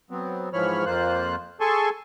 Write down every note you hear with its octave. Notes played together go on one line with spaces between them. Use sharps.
F#3 B3 C4
G#2 E3 F3 C#5 B5 F6
F2 A#3 F4 C5 F#6
G#4 A4 G#5 A5 C6 C#6